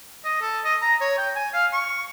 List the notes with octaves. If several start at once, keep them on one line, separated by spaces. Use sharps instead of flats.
D#5
A4
D#5
A#5
C#5
G5
G#5
F5
C#6